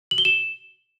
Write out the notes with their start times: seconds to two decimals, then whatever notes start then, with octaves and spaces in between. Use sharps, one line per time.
0.11 F#7
0.18 G7
0.25 E7